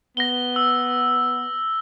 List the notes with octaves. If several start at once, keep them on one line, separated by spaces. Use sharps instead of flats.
B3 A#6 G7
E6